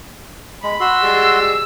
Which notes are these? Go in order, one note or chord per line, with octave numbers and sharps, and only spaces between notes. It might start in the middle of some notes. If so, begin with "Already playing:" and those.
G#3 B5
F#4 C6 E6
G3 G#3